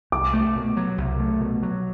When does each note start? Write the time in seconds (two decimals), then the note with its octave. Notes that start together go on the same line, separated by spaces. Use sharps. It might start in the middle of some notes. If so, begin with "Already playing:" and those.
0.12 C2 D6
0.33 A3
0.56 B2
0.77 F#3
0.98 C2
1.20 A3
1.41 B2
1.63 F#3